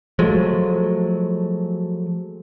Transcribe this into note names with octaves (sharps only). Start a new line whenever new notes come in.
F3 F#3 G#3 A3